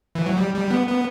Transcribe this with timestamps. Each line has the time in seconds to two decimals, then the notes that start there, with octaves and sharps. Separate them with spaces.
0.15 E3
0.26 F#3
0.37 G3
0.54 G3
0.70 B3
0.88 B3